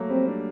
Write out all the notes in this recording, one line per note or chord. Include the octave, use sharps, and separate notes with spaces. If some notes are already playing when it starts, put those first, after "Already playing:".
Already playing: F#3 A3 A#3
G3 C4
D4